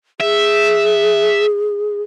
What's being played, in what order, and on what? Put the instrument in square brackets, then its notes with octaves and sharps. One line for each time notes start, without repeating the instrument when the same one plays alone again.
[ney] G#4 [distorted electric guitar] E5